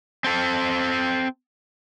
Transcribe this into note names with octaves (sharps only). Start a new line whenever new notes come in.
C4 A4